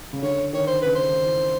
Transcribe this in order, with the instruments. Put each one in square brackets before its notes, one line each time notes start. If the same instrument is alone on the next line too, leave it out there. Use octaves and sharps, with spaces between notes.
[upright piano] C#3
[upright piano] D3 [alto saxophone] C#5
[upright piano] D#3 [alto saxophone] C#5
[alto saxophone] C5
[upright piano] C#3 [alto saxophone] B4
[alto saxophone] C5
[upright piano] D#3
E3